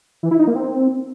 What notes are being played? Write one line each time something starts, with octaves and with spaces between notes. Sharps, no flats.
E3
E4
D#4
A#3
C4